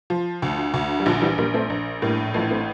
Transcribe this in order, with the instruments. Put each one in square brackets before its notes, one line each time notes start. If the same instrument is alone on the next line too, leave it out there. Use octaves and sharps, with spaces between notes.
[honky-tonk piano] F3
D2
D2
[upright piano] G3
[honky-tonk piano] A#1 [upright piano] D3 F3
[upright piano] E3 G3
[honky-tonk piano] A#1 [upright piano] G3 A#3
[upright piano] A3 C4
[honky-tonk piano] A#1
[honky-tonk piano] A2 [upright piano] G3 A#3
[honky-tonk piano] A1 [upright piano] F3 A3
[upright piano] A3 C4